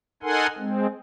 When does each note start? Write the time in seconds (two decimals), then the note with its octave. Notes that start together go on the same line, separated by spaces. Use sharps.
0.23 D#4 A4 A#4 F#5 G#5 C6
0.58 G#3 C4